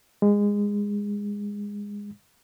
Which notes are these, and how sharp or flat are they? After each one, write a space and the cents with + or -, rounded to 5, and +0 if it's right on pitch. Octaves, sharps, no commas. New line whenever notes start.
G#3 -20